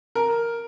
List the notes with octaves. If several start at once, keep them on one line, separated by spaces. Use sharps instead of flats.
A#4